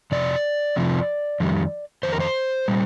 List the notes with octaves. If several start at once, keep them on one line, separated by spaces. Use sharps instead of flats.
F2 C3 D5
F2 C3 F3
F2 D#3 G3
F2 D#3 C5
A#4
C5
A#2 G3